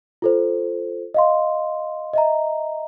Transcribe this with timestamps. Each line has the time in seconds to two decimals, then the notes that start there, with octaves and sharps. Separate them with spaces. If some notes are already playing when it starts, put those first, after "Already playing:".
0.22 F4 A4 C5
1.14 D#5 F5 C6
2.14 D#5 E5 A#5